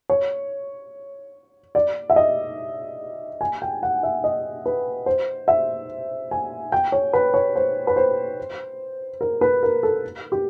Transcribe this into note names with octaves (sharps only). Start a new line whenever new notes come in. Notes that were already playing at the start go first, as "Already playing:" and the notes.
C#5
D5
E5
D#5
G#5
G5
F#5
E5
D#5
B4
C5
E5
G#5
G5
C#5
B4
C#5
C5
B4
C5
A#4
B4
A#4
A4
G4